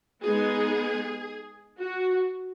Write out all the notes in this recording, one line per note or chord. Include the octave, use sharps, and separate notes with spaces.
G#3 B3 D#4 G#4
F#4